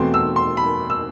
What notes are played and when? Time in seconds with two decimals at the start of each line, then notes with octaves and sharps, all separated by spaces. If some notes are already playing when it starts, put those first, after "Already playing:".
Already playing: E2 B2 A3 C4 C6
0.14 E6
0.36 C6
0.57 B5
0.90 E6